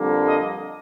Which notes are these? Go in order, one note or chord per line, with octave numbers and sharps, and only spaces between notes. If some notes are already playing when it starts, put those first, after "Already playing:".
Already playing: F2 D3 G3 A#3
D#5